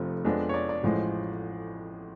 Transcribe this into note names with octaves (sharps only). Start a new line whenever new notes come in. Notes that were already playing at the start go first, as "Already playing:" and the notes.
Already playing: F1 F2 F3 A3
F2 F3 G#3 B3 D4
C#5
D5
D5
A1 A2 F3 G#3